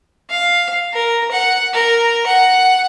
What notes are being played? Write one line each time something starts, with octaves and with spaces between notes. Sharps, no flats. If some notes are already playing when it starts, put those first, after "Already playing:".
F5
A#4
F#5
A#4
F#5